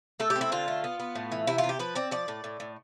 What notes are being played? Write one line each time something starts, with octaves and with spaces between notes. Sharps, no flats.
A3 A4
G4
C4
E4
D3 F4
A3
B3
B3
A2
E3
C3 E4
F4
C3
G4
F3 B4
C4 D5
F3 D5
A2
A2
A2